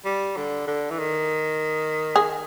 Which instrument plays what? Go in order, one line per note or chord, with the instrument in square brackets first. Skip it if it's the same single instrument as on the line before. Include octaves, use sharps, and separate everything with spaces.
[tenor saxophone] G3
D3
D3
E3
D#3
[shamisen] G#4